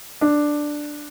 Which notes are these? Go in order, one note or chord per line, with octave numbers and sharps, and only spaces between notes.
D4